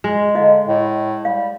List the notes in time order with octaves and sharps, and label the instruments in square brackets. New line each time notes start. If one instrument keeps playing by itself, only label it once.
[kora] G#3
[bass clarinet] D3 [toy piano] E4 D#5 F5
[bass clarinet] A2
[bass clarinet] G3 [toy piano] F5